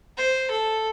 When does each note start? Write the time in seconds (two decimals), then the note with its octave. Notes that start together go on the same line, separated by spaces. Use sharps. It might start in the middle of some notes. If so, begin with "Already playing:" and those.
0.18 C5
0.51 A4